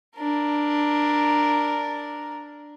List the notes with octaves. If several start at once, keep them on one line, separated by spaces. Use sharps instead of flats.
D4 A#4